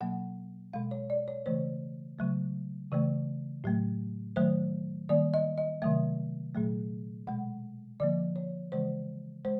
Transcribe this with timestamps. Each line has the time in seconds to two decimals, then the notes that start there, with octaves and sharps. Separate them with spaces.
0.01 B2 F#3 A#3 F#5
0.73 B2 G#3 F5
0.91 C#5
1.10 D5
1.28 C#5
1.46 C#3 E3 A3 C5
2.18 C#3 F#3 A3
2.91 C#3 E3 A3
3.64 A2 F#3 A3
4.36 D#3 F#3 A3 C5
5.09 D#3 G3 A#3 D5
5.34 D#5
5.58 D#5
5.82 C3 D#3 F#3 A3 E5
6.55 A#2 F#3 A3
7.27 B2 G#3 F#5
8.00 D3 F3 A#3 D5
8.36 C#5
8.72 C#3 E3 G#3 C5
9.45 G#3 C5